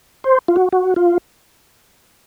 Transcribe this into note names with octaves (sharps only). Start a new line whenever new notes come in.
C5
F4
F#4
F#4
F4